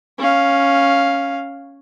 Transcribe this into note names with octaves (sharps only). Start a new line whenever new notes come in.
C#4 F5